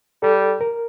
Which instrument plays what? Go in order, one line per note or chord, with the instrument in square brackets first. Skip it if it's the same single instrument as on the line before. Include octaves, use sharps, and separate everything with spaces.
[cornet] G3 [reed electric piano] A4
[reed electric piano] A#4